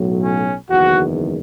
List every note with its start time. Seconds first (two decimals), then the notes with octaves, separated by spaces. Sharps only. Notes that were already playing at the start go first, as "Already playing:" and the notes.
Already playing: B1 A2 F#3
0.24 C#4
0.70 F#1 E2 D#3 F#4